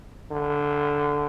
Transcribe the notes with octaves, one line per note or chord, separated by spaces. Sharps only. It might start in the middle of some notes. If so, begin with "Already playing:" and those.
D3